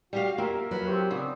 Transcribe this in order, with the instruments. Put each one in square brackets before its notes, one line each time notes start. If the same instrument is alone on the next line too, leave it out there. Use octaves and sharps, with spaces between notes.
[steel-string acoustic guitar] G3 G4 F5 [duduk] F#4
[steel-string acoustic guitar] A#3 [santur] F4 A#4 E5 [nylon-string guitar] G4
[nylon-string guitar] F#3 [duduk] B4
[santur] C4 F4 C#5 [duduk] G4
[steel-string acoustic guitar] C#3 [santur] B3 D5 [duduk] C4